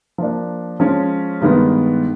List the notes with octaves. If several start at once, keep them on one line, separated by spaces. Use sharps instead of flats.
F3 A#3 D4
F3 G#3 C#4
G2 D#3 G#3 B3